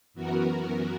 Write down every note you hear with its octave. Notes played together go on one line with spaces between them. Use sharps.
F#2 E3 B3 F#4 A#4